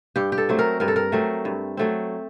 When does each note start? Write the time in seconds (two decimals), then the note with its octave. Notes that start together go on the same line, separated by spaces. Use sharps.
0.16 G2 G4
0.32 G4
0.38 A4
0.49 F#3 A3 C4
0.59 A#4
0.80 G2 A#4
0.88 A4
0.96 A#4
1.12 F#3 A3 C4
1.45 G2
1.77 F#3 A3 C4